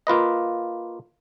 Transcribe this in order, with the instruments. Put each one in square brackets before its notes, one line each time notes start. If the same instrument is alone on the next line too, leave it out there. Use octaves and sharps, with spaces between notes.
[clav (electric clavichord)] A#3 F4 B4 D#5